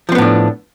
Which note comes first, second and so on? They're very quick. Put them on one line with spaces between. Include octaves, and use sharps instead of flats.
F3 C4 B3 A2 D4